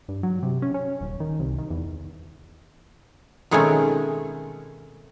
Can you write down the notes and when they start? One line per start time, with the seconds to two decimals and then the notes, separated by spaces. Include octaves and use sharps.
0.08 G2
0.23 F#3
0.43 C3
0.62 C#4
0.74 C#4
1.00 D#1
1.20 D#3
1.39 C2
1.58 D#3
1.70 E2
3.51 B2 D#3 G#3 A3 C4 C#4